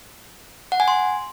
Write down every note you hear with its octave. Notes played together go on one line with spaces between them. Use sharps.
F#5
G#5
C6